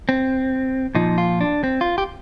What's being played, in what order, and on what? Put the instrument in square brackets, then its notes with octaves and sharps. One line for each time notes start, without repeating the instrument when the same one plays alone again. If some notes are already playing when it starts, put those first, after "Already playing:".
[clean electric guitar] C4
A#2 F3 D#4
F4
D4
C4
F4
G4